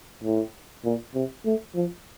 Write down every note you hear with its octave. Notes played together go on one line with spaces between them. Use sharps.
A2
A#2
C3
A3
F3